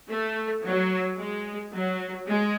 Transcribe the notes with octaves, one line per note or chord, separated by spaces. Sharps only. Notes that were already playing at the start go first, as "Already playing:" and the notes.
A3
F#3
G#3
F#3
G#3